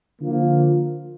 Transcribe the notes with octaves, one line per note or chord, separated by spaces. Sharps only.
D3 F3 A#3 F4